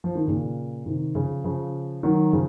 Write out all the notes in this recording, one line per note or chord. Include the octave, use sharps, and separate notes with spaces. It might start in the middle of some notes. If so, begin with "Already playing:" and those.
F3
D#3
A#2 C#3
C3 D#3
C#3 F3
C#3 F3
D#3 F#3
C#3 F3